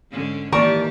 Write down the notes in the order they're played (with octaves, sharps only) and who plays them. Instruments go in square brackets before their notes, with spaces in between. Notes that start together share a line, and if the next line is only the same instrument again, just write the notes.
[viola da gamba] G#2 D3 C#4
[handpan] D#3 A#3 [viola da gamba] E3 G4 [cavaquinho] A#4 A5 C#6 [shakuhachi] D5